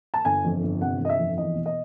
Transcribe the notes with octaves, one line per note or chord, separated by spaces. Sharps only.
A5
G1 G#5
F2
G1
C3 F#5
G1 D#5
E5
F2
E2 D#5
B2
D#5